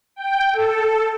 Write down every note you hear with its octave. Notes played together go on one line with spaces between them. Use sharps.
G5
A4